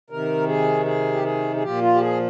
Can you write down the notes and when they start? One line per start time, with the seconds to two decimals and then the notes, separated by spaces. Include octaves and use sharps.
0.10 C3 D#3 A#4
0.47 G#4
0.86 G#4
1.13 G4
1.24 G#4
1.56 G#4
1.62 A#2 F3 G4
1.82 F4
1.94 G4
2.01 G#4